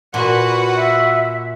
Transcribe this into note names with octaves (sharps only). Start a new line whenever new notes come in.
A#2 F#4 B4 F#5
E5